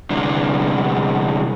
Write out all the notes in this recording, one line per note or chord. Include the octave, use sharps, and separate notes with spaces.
C2 D3